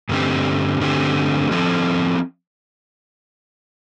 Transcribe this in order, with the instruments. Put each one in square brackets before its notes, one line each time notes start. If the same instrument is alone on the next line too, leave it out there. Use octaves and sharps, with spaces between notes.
[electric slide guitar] G2 D3 A3 C4 G4
G2 D3 A3 C4 G4
F3 C4 E4 A4